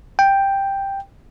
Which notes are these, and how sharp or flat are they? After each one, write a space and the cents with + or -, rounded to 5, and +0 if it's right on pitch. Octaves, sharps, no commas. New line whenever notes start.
G5 +5